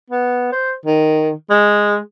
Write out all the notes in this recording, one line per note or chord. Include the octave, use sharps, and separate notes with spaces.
B3
C5
D#3
G#3